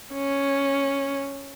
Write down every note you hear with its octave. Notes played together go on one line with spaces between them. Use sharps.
C#4